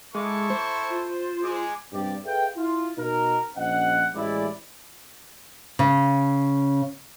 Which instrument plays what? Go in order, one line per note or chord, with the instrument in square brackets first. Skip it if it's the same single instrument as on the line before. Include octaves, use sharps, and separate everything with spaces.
[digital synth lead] G#3 [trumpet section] E4 A4 C#6 [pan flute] D6
[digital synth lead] C5
[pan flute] F4
[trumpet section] G#3 G#4 D6
[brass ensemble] G2 C3 G4 D5
G#4 A4 B4 E5 F5 G5
E4 F4
B2 D#4 A#4
A#1 C#4 C5 D#5 F#5
A1 G#3 E4 D5
[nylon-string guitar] C#3